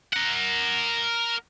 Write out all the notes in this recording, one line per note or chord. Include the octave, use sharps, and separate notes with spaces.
A#4 F#5